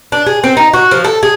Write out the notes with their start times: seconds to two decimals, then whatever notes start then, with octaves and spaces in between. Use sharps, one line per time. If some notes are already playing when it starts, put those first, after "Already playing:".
0.12 D4
0.27 G#4
0.44 C4
0.57 D#4
0.74 F#4
0.91 F3
1.04 A4
1.23 G#4